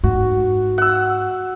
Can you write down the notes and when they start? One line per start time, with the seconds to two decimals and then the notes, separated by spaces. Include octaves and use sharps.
0.04 G#2 F#4
0.78 F#5 E6